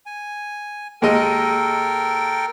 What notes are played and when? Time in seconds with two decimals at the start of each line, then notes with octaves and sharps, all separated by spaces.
0.06 G#5
1.02 D#2 G#3 A4 A#4 D#5 G5